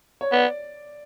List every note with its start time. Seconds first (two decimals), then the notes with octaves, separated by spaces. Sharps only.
0.21 C#5
0.32 B3 D5